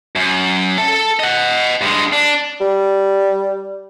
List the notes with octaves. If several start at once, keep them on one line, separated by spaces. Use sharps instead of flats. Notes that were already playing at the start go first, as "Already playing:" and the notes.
F#2
A4 A5
D#5 F#5
G2 G#3
D4
G3